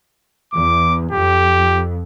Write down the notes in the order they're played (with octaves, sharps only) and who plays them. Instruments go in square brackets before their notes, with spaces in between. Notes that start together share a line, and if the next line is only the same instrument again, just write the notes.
[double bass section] E2 [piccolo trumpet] D6
[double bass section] F2 [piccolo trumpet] G4